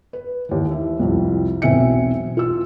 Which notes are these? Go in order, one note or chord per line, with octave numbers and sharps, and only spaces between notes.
B4
D#2 E3
E4
C2 F2
E1 B1 C4 E5 G#5 C#7
F4 E6